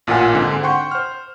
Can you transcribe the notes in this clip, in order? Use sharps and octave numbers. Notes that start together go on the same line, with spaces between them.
A1 A#2 F4 A#4 F#5 G#5
G#2 D3 C4
C5 F#5 G5 C6 C#6
C5 F6